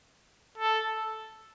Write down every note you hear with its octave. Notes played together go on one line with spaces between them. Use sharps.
A4